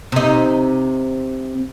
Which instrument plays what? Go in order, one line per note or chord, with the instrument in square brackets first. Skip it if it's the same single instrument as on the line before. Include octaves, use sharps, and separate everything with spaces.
[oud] C3 D#4